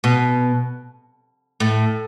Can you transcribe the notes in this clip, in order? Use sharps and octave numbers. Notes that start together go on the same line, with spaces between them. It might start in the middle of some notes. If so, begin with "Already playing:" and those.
B2
A2